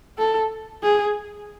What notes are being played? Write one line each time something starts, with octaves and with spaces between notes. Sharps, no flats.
A4
G#4